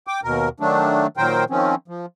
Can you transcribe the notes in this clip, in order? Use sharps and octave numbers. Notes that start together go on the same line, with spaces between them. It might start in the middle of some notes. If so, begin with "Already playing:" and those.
G5 D6
D#2 B2 A#4
D#3 F#3 A3 D4
A#2 D#3 F#3 A#4 C5 G5
D#3 F3 C4 C#4
F3